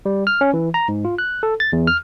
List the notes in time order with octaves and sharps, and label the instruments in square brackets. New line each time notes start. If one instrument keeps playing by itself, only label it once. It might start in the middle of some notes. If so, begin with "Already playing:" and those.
[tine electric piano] G3
F6
C#4
E3
A#5
G#2
F4
F#6
A4
A6
E2
F6